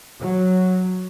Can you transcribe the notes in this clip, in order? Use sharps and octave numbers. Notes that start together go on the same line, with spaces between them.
F#3